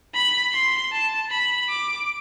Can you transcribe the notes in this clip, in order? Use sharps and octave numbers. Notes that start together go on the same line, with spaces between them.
B5
C6
A5
B5
D6